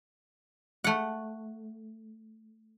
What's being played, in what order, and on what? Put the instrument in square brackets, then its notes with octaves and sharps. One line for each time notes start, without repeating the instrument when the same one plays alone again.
[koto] A3 F#5